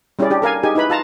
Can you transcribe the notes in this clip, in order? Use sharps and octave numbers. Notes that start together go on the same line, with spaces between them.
G3 C#4 E4 G4 G#4 D5
D4 G4
A4 A#4 F5 G#5
D#4 G4 G#4 G#5
D#4 E4 B4 B5
F4 A5 A#5